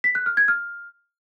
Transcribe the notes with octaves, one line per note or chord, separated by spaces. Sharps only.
B6
F#6
F6
G#6
F6